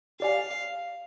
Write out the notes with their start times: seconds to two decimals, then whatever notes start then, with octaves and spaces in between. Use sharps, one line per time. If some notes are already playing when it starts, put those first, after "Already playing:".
0.20 G4 D5 F5 G#5